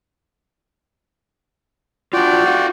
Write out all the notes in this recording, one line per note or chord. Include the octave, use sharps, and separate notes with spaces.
D4 F4 F#4 D5 G5
F4 F5 F#5